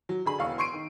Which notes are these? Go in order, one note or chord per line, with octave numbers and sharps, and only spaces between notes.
F#3
D3 G#4 B5
E1 E2 F5 C#6
C6 C#6 C7 D7 D#7
D#3